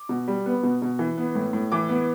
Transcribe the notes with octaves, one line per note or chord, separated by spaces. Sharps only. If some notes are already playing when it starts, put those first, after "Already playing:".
Already playing: D6
B2
G3
B3
B2
B2
E3
B3
A2
A2
E3 D6
B3